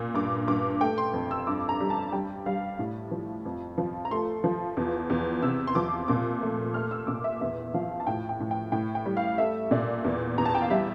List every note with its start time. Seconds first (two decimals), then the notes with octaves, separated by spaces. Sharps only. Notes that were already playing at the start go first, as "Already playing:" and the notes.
Already playing: A#2
0.14 G2 D6
0.48 G2 D6
0.81 A3 G5
0.98 C6
1.13 F2
1.31 E6
1.47 G2 D6
1.69 A#5
1.80 G3
1.90 A5
2.12 G3 G5
2.46 G3 F5
2.79 A2
3.11 F3
3.45 F2
3.78 F3
4.05 A#5
4.11 A3 C6
4.44 F3
4.77 E2
5.10 E2
5.42 C3 E6
5.67 C6
5.75 F3 D6
6.08 A#2 D6
6.42 A3
6.74 A3 F6
6.91 E6
7.07 A#2 D6
7.24 E5
7.41 E2 E5
7.74 F3 F5
8.00 A5
8.07 A2 G5
8.29 G5
8.40 A2
8.51 G5
8.72 A2 G5
8.95 G5
9.06 G3
9.17 F5
9.38 A3 E5
9.71 A#2 D5
10.04 E2
10.38 E2 A#5
10.46 A5
10.55 G5
10.62 F5
10.70 G3 E5